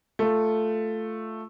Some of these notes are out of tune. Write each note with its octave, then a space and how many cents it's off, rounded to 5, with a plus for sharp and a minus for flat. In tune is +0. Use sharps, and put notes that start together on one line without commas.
A3 +0 F4 +0